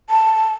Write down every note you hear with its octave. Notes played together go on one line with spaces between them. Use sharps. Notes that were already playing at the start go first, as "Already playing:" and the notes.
A5